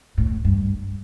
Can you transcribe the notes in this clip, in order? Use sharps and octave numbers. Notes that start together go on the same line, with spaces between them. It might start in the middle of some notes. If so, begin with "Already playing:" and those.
A2
G2